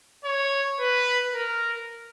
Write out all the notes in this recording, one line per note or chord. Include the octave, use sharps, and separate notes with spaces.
C#5
B4
A#4